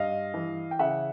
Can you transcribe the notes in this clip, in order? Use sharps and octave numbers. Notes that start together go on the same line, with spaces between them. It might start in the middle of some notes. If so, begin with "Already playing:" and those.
Already playing: G2 D#5 F5
E3
G5
C#3 E5 F#5